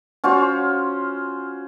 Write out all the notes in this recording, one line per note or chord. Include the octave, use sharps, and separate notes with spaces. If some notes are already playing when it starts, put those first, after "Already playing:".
C#4 F4 F#4 C5